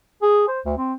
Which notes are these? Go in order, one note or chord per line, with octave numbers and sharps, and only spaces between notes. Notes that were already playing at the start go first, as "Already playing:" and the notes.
G#4
C5
D2
C4